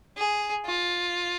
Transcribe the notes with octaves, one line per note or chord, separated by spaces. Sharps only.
G#4
F4